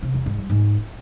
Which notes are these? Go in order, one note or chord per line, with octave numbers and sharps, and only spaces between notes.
C3
E2
G#2
G3
G#2